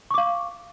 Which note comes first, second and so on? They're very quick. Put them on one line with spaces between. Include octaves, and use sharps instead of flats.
C#6 D6 F5